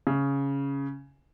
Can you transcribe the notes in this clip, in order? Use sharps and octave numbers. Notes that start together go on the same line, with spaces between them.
C#3